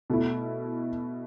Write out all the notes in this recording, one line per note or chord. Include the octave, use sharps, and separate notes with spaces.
B2 A3 E4